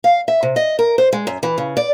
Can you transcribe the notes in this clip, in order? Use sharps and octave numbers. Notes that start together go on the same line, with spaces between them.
F5
E5
C3
D#5
A#4
C5
G#3
F#2
E3
C#3
D5